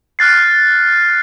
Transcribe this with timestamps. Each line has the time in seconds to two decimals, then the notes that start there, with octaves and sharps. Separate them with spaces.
0.19 F6 F#6 A6 C7